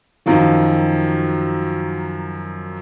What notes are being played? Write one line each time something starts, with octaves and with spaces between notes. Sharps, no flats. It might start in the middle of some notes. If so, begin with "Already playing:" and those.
F#2 D#3 F3 F#3